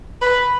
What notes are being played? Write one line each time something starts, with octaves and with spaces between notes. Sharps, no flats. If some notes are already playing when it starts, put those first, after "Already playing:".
B4